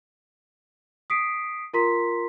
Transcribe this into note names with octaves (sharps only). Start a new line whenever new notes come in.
D#6 B6 C7 D7
F4 A#4 A#5 C6 B6